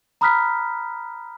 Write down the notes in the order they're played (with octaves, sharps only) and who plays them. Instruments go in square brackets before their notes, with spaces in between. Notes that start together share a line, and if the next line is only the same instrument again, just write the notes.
[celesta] A#5 B5 D#6 F6 F#6 B6